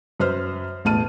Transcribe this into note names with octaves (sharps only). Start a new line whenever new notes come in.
F#2 B4 C5 F6
E1 A1 A2 A5 F6 D#7